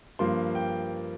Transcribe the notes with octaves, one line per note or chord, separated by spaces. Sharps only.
G2 F3 A#3 C6
G5